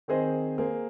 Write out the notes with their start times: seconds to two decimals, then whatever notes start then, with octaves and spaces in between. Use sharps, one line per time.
0.08 D#3 C4 G#4 C5 D#5
0.58 A#3 G#4 C5